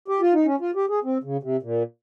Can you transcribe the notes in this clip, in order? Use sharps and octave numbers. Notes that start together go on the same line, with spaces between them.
G4
F4
D#4
C#4
F4
G4
G#4
C4
C#3
C3
A#2